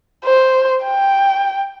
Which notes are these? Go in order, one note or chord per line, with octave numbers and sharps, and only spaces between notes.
C5
G5